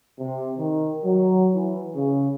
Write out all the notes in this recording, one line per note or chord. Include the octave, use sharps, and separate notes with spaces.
C3
D#3
F#3
E3
C#3